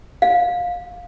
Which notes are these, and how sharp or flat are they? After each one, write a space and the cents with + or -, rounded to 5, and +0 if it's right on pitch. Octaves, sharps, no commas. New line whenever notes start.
F5 +15